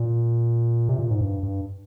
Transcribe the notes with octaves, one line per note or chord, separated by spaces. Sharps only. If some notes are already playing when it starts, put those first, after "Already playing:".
Already playing: A#2
C3
A#2
G#2
G2
G2